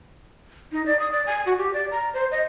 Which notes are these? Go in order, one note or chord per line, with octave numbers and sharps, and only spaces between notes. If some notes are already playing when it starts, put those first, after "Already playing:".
D#4
D5
D#6
D5
G#5
F#4
G4
D5
A#5
C5
D#5